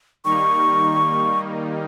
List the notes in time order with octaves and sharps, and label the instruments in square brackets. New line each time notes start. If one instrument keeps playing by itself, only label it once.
[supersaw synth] D#3 G3 A#3 D#4 [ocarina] C#6